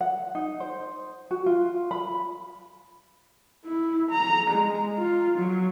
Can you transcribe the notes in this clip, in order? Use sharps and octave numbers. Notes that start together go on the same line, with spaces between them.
F#5
D#4
C5
F#4
F4
B5
E4
A#5
G#3
F4
F#3